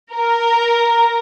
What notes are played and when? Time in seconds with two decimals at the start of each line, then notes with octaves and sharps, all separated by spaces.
0.12 A#4